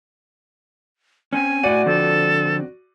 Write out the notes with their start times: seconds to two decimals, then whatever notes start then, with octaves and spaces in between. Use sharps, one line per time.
1.33 C4 C#4 G#5
1.63 A2 F#4 D5 F#5 D#7
1.86 D3 F3 C4 A4